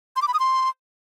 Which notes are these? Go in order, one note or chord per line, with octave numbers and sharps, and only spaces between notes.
C6
D6
B5
D#6
C6